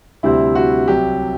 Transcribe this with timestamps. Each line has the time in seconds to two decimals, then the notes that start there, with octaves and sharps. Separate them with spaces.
0.23 D2 C3 G3 C4 E4
0.55 F#4
0.88 C2 C3 F#3 G4